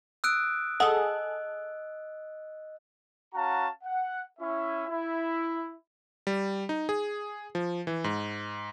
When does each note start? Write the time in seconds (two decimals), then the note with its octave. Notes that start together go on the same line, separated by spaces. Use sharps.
0.24 D#6 E6 F#6 D7
0.80 G#4 A4 D#5 F#5
3.34 C#4 F#4 F5 F#5 A5 A#5
3.84 F#5
4.39 C#4 E4 E5
4.87 E4
6.27 G3
6.69 D#4
6.89 G#4
7.55 F3
7.87 E3
8.04 G#2